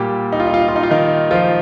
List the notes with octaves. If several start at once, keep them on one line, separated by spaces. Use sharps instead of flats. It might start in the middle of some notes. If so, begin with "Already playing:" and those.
Already playing: A#2 G3 G4
D#4
F4
D#4
F4
D#4
F4
D#4
F4
D#3 D#4
F3 F4